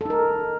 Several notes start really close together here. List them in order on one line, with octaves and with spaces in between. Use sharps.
A4 D#4 A#4